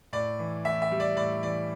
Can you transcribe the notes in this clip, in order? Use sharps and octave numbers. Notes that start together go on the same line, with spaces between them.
A2 D5
E3
A2 E5
E5
G3
D5
A2 D5
E3 D5